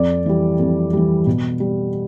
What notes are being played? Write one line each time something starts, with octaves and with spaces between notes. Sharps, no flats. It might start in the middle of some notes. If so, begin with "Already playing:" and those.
Already playing: F2 D5
E3 G3
F2
E3 G3
B2
G3